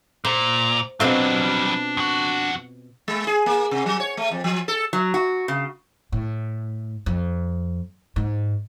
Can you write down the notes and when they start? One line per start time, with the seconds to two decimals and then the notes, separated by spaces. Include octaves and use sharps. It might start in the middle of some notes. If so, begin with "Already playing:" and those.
0.25 A#2 C5 A#5
1.00 B2 F#3 G3 C4 D4 F4
1.97 F2 F#4
3.08 G#3
3.27 G#4
3.46 A#3
3.71 C3
3.86 F#3
4.00 C#5
4.17 A3
4.31 F2
4.44 F3
4.68 A4
4.93 F#3
5.14 F#4
5.48 C#3
6.12 A2
7.06 F2
8.16 G#2